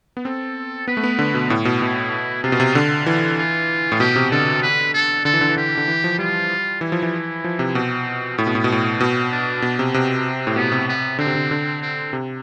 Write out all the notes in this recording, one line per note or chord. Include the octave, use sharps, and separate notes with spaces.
B3
C4 A4
B3 B4
A3
B3
D3
B2
A2
B2
B2 E4
C3 F4
B2
C3
D3
E3 F4
F4
A2
B2 G4
C3
D3 A4
B4
A4
D3 A4
E3
D3
E3
D3 G4
D3
E3
F3
G3 F4
E3 E4
F3
E3
F3
C3
B2 C4
A2 B3
B2
A2
B2
A2 C4
B2
D4
B2
C3
C3 C4
A2
B2 B3
C3
B3
D3 C4
C3
D3
D3
C4
C3